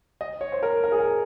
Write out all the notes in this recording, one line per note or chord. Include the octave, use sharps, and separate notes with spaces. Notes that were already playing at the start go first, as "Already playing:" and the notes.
D#5
C#5
C5
A#4
A#4
G#4
A#4